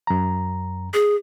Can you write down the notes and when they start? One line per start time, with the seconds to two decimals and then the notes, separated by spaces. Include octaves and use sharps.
0.07 F#2 A#5
0.94 G#4